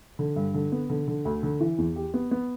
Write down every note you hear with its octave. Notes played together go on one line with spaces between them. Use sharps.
D3
G2
D3
B3
D3
D3
D2
D3
E3
E2
G4
B3
B3